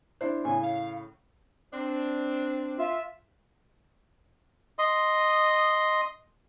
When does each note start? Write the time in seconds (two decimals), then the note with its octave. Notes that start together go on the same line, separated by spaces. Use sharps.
0.21 D4 E4 C5
0.45 A2 C#3 G#5
0.62 F5
1.73 C4 D4
2.78 F4 E5
4.79 D#5 C6 D#6